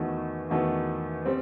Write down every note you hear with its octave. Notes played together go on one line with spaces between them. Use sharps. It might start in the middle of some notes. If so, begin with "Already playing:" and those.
Already playing: E2 D#3 A3 D#4 F#4
E2 D#3 A3 D#4 F#4
G3 C4